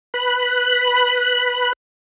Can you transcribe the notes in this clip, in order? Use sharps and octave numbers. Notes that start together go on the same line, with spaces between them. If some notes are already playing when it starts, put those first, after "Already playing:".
B4 B5 F#6